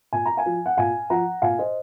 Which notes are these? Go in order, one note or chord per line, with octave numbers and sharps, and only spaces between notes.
A#2 G#5
A#5
F5 G#5
F3
F#5
A#2 F5 G#5
F3 F#5 A#5
A#2 F5 G#5
C5 D#5